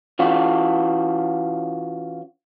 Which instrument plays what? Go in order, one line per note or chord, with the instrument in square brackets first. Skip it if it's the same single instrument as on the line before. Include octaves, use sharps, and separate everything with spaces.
[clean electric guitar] E3 C#4 F4 F#4